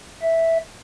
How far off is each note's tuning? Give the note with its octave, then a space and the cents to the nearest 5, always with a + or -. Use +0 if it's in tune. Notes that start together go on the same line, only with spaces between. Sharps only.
E5 -5